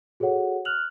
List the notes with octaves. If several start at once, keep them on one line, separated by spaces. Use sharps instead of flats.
F#4 G#4 A4 C#5 F#5
F6 F#6 F7 F#7